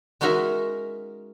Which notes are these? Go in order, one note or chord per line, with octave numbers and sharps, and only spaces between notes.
G#3 C#4 D#4 F#4 A#4 E5